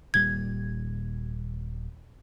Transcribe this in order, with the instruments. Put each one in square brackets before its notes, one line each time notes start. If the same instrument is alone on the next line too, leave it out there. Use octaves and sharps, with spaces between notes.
[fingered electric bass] D#1 A#2 G3 [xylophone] G#6